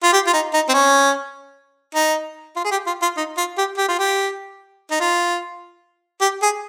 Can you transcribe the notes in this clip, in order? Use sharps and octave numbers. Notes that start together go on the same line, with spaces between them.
F4
G4
F4
D#4
D#4
C4
C#4
D#4
F4
G#4
G4
F4
F4
D#4
F4
G4
G4
F4
G4
D#4
F4
G4
G#4